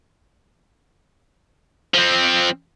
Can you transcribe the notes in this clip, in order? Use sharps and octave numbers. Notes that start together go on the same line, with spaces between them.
F3 C4